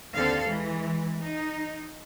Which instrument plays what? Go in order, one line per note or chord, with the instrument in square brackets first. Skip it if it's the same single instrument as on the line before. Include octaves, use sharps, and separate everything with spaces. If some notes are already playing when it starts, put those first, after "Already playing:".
[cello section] D#2 D3 C4 A4 F5
E3 G#3
D#4